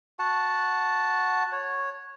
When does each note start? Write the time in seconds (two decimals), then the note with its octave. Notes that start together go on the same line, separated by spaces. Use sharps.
0.19 F#4 F#5 A5
1.52 C#5